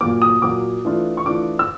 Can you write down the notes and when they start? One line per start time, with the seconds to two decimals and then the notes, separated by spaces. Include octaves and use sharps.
0.01 A#2 F#3 A#3 D6
0.22 D#6
0.42 A#2 F#3 A#3 D6
0.85 E3 A3 D4 F4
1.17 C#6
1.26 E3 A3 D4 F4 D6
1.59 E6